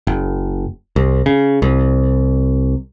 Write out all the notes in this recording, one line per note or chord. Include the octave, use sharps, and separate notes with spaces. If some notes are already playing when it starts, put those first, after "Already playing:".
F#1
C2
C#3
C2